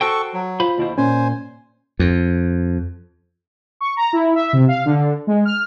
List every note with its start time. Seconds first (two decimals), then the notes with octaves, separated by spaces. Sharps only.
0.01 F#4 A4 C5 G5 C#6
0.34 F#3
0.60 F4 C5 B5
0.78 D#2 B2 E4 C5
0.98 A#2 C#4 C5 G#5
1.99 F2
3.81 C#6
3.97 A#5
4.13 E4
4.35 E5
4.53 C3
4.68 F5
4.85 D3
5.27 G#3
5.45 F6